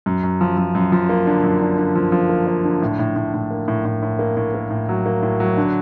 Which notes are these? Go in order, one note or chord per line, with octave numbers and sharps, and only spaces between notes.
F#2
F#2
F3
F3
F#2
F3
A#3
D3
F#2
D3
D3
F3
F3
A#3
A#3
D3
A2
A2
A2
A2
A#3
A2
A2
A2
A#3
A2
A#3
A2
F#3
A#3
A2
F#3
D3